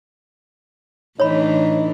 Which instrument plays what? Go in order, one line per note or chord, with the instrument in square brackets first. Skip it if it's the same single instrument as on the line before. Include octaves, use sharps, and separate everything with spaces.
[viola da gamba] A2 E3 D4 [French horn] D#4 [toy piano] C#5 B5